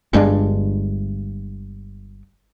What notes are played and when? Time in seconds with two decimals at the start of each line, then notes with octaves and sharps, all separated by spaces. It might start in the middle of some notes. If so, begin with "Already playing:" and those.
0.13 G1 G2 G#3 D4